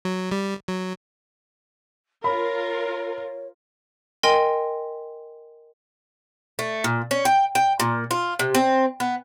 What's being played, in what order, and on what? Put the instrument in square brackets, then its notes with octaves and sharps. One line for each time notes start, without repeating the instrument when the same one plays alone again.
[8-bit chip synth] F#3
G3
F#3
[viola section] F4 A#4 [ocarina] C#5 [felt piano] B5
[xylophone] A#4 D#5 G5 G#5 C6
[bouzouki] A3
A#2
C#4
G5
G5
A#2
F4
C3
C4
B3